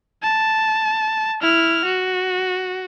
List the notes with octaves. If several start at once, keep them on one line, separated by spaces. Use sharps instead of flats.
A5
E4 F6
F#4